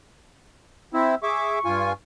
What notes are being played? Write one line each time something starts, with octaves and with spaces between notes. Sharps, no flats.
C4 E4 E5
G#4 E5 C#6 D6
G2 F4 G#5